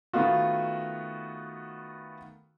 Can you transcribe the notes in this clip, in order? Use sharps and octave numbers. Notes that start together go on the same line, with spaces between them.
D#3 A3 B3 F4 F#4